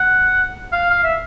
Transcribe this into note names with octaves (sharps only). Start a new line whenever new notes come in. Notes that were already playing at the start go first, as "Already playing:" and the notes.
Already playing: F#5
F5
F5
E5